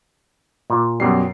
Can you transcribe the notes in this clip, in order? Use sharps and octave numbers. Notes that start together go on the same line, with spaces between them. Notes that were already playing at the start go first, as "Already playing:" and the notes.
A#2
F#2 B2 G3 C7